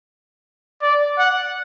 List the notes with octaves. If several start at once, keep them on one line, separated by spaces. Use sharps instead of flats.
D5
F#5